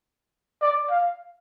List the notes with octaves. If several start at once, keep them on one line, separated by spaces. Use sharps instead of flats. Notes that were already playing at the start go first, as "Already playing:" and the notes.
D5
F5